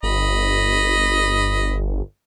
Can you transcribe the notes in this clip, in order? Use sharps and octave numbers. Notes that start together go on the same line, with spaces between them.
G1 D#5 B5